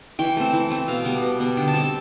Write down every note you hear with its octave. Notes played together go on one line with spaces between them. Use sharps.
E3 G5
A3 C4
E3
A3 C4
B2 F5
G3 B3
B2
G3 B3
D3 G5
A5
G3 C4
A5